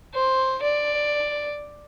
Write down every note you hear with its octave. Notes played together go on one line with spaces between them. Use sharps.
C5
D5